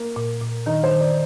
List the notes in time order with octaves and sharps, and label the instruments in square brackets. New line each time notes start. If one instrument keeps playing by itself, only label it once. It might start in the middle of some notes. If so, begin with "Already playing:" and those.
Already playing: [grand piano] A#3
[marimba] A#2
A#2
[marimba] D#3 [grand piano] D#4
[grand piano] C5
[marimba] D#3
[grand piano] D5